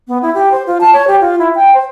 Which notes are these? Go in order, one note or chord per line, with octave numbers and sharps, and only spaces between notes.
B3
E4
G4
C5
F4
A5
C#5
G4
F4
E4
G5
C5